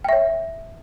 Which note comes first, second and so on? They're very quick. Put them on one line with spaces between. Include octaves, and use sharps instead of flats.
G5 E5 C#5